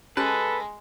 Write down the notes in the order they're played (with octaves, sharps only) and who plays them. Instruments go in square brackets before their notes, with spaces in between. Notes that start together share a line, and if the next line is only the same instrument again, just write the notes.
[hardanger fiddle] G#3 [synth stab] C#4 G4 A5 [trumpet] A4 [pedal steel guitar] B4